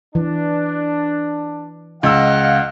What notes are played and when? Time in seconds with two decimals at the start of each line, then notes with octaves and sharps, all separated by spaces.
0.15 E3 D4
2.03 C#2 D#5 F5 F#5 E6